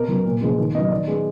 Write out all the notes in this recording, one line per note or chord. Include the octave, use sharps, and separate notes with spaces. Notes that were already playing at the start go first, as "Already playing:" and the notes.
Already playing: B2 A#4
F#3 B3
A#2
F3 G#3 B3
D#3
F#3 B3 D#5
D#3 D5
G#3 B3